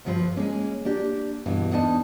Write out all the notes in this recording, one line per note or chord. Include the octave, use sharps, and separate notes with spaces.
D2 G2 F3 B4 C5
G#3 A#3 C#4
A#3 D4 G4
D2 G2 B2 E3
E2 B3 D4 D#4 A5